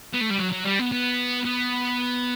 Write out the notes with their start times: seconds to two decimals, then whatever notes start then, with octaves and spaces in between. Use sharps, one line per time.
0.14 B3
0.21 A3
0.31 G3
0.40 F#3
0.52 F#3
0.65 G3
0.79 B3
0.92 B3
1.45 B3